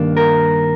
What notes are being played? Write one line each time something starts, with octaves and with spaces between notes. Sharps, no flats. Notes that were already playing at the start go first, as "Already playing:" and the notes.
Already playing: G2 D#3 A#3 D4
A#4